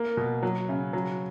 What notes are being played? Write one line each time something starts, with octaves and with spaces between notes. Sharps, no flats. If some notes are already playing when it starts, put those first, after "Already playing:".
Already playing: A#3
B2
F#3
C#3
F#3